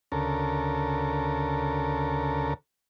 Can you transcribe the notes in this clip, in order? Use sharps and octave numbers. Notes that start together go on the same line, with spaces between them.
D2 C#3 A4 A#4